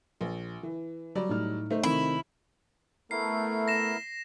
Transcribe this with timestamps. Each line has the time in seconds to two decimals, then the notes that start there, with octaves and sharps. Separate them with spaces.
0.21 A#1
0.63 E3
1.15 F#3 G3 D5
1.29 A2 D#4 F6
1.70 A3 D#4 C5
1.83 C3 D#3 E4
3.11 A3 B3 E4 A#4 C7
3.68 A#6 E7